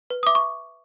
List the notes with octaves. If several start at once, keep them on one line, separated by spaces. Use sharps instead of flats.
B4
D#6
E5 D6
C#6